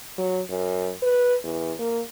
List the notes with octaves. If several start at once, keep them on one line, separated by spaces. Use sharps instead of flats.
F#3
F#2
B4
E2
A#3